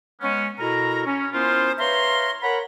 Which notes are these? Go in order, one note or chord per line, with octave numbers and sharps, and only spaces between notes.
G#3 B3 C#4
B2 E4 A4 A#4 A#5
C#4
B3 C#4 E4 F4 A#4 C5
B4 C#5 E5 F5 A#5 C6
A#4 C#5 F#5 A#5 B5